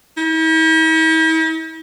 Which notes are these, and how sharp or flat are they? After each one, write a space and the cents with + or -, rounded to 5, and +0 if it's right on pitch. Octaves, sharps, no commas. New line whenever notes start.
E4 -45